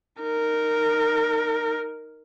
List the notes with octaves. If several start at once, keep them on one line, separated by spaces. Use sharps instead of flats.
D#4 A#4